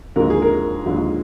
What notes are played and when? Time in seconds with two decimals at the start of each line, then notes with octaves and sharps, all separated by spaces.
0.16 D#2 D3 F3 G#3 A#4
0.30 G#4
0.42 A#4
0.86 D#2 D3 F3 G#3